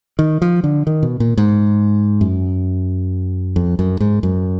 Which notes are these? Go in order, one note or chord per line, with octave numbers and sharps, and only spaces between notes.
D#3
F3
D3
D#3
B2
A#2
G#2
F#2
F2
F#2
G#2
F#2